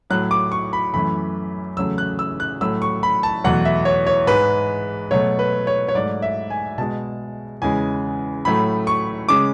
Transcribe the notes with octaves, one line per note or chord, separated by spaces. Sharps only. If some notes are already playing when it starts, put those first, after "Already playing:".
A2 F#3 A3 F#6
D6
C#6
B5
F#2 E3 A3 B5
E2 C#3 F#3 A3 E6
F#6
E6
F#6
A2 F#3 A3 E6
C#6
B5
A5
E2 B2 F#3 A3 F#5
E5
C#5
C#5
G#2 G#3 B4
B2 F#3 A3 C#5
B4
C#5
C#5
G#2 F#3 A3 D5
E5
G#5
B2 G#3 A5
E2 C#3 E3 G#3 G#5
A2 F#3 A3 B5
C#6
C#3 G#3 D6